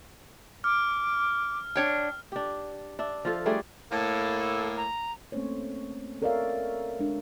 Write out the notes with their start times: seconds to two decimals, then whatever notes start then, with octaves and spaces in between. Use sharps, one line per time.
0.64 D6 F6
1.76 D4 C#5 G5
2.32 D4 G4
2.99 D4 E5
3.25 F3 F4 A4
3.46 G3 A3 D4 G#4
3.91 A2 A#3 A4
4.77 A#5
5.32 A3 A#3 C4 C#4 C5 C#5
6.22 A4 A#4 C#5 D5 E5 F5
7.00 G#3 D4